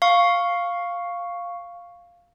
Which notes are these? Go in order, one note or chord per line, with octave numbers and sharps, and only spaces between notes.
F5 C#6